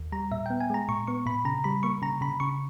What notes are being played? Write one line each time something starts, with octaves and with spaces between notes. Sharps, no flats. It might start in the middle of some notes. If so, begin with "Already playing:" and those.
Already playing: D#2
G3 A#5
A#2 E5
B3 G5
G#5
G#3 A#5
A#2 C#6
B3 C#6
A#2 B5
C#3 A#5
G3 B5
A#3 C#6
C#3 A#5
C#3 B5
C#3 C#6